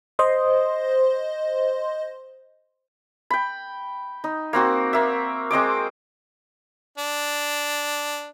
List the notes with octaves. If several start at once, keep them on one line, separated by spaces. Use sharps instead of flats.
C5 D#5 C6
G5 B5
D#4
A#3 C4 F#4
A#3 E5
G#3 C4 D#5 D6
D4